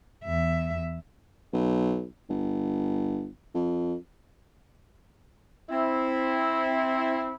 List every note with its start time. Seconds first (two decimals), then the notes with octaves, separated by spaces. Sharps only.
0.24 E2 E5
1.53 B1
2.30 G1
3.54 F2
5.70 C4 E4